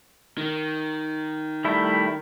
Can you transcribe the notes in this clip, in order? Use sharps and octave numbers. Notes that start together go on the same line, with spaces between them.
D#3
G3 A3 E4